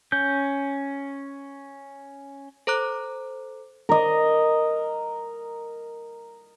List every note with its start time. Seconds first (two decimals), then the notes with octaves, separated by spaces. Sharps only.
0.12 C#4 G6
2.67 A4 C5 A#5 D6 F#6
3.89 A#4 D#5